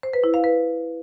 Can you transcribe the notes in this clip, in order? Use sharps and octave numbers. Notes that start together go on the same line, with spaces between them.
C5
B4
E4
F5
B4